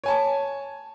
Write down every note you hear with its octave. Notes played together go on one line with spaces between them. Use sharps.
C#5 G#5 A5